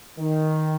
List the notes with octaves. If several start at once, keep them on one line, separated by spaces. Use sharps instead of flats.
D#3